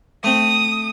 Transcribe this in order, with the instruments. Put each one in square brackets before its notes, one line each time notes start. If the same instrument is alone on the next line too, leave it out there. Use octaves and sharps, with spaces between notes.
[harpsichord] A3 C4 [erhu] D#6